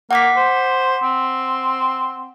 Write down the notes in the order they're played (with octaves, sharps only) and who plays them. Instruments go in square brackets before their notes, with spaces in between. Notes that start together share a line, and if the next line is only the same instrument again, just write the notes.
[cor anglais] A#3 [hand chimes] F#5 D6 B6
[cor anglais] C5
C4